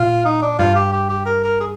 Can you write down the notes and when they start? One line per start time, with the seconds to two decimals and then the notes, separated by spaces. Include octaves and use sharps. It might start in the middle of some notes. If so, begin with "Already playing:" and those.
Already playing: A#2 F4
0.25 D#4
0.42 D4
0.59 G2 F4
0.75 G4
0.93 G4
1.09 G4
1.26 A#4
1.44 A#4
1.60 G#4